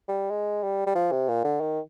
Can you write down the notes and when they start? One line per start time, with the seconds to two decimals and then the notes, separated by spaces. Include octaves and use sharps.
0.08 G3
0.30 G#3
0.63 G3
0.86 G3
0.95 F3
1.12 C3
1.28 A#2
1.44 D3
1.60 D#3